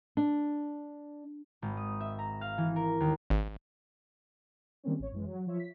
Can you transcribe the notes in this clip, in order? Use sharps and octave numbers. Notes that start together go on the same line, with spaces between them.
D4
G#1
D#6
E5
A#5
F5
E3
A#4
D#2
G#1
D#3 G3 G#3 A#3 C4 C#4
A1 C#5
F#2 E3 G#3
F#3
F3 F4 C#5 E5
B6